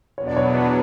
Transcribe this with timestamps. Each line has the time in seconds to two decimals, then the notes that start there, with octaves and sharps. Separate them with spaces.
0.18 E2 B2 F#3 B3 D4 C#5
0.27 D5
0.36 C#5